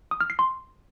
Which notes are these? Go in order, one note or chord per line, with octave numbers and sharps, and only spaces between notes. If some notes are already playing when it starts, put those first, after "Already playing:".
D#6
F6
C7
C6